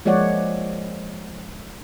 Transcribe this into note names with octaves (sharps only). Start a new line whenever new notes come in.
F3 G#3 A#3 C#5 D5 F#5